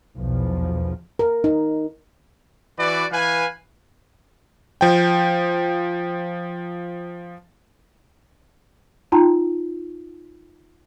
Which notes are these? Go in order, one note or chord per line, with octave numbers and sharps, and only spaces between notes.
B1 E2 F3
A#4
D#4
E3 F#4 B4 D5
E3 B4 F5 G#5
F3 G5
D#4 F4 G5 A5 A#5 C6